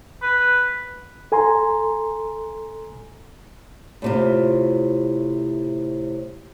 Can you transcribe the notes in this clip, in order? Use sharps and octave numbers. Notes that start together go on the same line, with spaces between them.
B4
A4 G#5 A#5 C6
A2 C3 F4